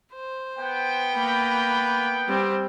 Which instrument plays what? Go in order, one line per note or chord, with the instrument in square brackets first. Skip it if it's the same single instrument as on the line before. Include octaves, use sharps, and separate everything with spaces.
[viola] C5
[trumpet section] B3 G5
[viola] A#3 B5
G3 C4